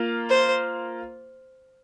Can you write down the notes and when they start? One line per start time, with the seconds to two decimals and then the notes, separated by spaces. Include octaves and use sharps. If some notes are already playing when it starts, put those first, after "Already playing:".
Already playing: A#3 F4
0.30 C5